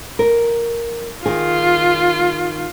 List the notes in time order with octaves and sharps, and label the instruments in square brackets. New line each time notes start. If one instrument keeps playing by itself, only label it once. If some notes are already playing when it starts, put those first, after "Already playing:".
[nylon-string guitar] A#4
[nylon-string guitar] D#3 G#4 [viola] F4